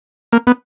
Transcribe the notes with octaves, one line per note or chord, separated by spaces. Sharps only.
A#3
B3